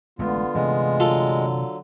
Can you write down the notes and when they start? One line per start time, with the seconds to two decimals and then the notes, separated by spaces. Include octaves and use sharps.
0.19 A1 D3 G#3 A3 B3 F4
0.55 C3 E3 G#3 A3
1.00 D3 F#3 F4 A4